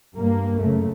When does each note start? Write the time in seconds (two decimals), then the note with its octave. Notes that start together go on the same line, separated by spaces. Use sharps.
0.17 G2 A#3
0.61 F#2 C#3 A3